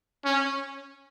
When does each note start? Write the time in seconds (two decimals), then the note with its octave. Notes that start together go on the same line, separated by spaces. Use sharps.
0.25 C#4